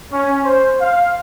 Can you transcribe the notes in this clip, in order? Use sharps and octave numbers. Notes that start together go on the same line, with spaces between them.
C#4
C5
F5